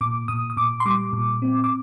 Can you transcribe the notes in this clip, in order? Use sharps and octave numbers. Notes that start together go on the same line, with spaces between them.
A#2 D6
A#2 D#6
D#6
A#2 D6
C6
G3 D6
A#2
C4
D6